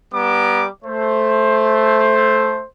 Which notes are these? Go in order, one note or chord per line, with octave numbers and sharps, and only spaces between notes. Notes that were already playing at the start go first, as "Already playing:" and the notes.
G3 B3 A#5 D6
A3 C5